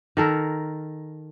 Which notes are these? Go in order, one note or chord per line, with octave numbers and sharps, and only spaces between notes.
D#3 A4 A#4